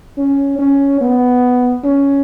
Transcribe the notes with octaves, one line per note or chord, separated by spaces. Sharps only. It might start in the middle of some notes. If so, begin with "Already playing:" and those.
C#4
C#4
B3
C#4